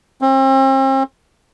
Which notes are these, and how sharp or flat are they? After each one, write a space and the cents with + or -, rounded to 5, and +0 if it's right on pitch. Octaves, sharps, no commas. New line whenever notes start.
C4 +40